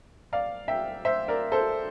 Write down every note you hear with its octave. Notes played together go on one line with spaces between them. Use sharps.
D5 F5
E5 G5
C5 E5
A#4 D5
A4 C5